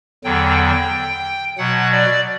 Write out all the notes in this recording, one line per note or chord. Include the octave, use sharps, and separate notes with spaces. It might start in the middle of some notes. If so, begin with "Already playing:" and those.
E2 D3 F#3 G5
B2 F#3 F#5
D5